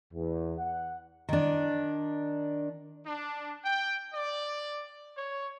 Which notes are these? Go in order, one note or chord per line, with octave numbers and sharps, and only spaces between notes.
E2
F#5
D#3 D4
D4
G5
D5
C#5